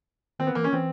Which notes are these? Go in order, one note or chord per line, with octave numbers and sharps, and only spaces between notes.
D#3 C4
B3
E3 A#3
C#4
E3 C4